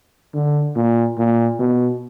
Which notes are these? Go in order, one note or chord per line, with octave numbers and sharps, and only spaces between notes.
D3
A#2
A#2
B2